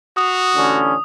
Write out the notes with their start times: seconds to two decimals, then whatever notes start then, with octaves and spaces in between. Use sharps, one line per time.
0.17 F#4 D#6
0.55 A1 D3 C#4